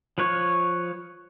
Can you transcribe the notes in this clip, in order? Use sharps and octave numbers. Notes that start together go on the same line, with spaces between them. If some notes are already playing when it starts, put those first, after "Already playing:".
F3 B4 C#5